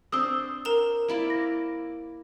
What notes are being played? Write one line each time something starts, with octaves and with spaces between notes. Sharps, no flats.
C4 D4 C5 D#6 E6 G7
A#4 A#5 E7
A#3 E4 D5
A#6